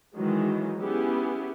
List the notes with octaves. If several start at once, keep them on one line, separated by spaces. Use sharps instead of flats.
D#3 E3 F#3 G#3
B3 C#4 E4 G4 G#4